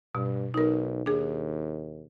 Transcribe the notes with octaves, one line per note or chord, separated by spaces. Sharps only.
G2 B2
B1 D#4 A#4
D#2 D4 G#4